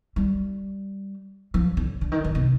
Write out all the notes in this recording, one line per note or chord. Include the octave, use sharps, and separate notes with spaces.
G3
F3
D3
D3
D#3
D3
C3